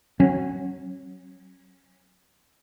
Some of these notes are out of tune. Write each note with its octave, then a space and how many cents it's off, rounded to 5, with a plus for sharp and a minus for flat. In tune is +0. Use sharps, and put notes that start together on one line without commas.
F#3 +0 C#4 -30